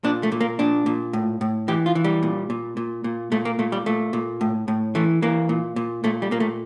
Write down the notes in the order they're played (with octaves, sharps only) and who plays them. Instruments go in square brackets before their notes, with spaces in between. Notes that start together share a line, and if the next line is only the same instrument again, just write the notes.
[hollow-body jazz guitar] A#2 D4
A3
A#2
A#3
A#2 D4
A#2
A2
A2
E3 G4
F4
E3
G3
A#2
A#2
A#2
A#2
A#2 A3
A#3
A#2 A3
G3
A#2 A3
A#2
A2
A2
E3 A3
E3 A#3
A#2
A#2
A#2 A3
G3
A#2 A#3
A3